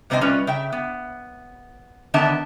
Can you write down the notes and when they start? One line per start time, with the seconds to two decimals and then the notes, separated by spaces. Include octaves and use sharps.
0.10 G2 C3 C4 C#4 D#5 G#5
0.21 G3 C#4 F4 B4
0.47 C#3 E5 G5
0.72 B3
2.14 D3 D#3 B3 D4 E5 A5